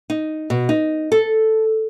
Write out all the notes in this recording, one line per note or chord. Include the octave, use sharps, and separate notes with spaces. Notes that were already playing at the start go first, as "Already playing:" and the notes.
D#4
B2
D#4
A4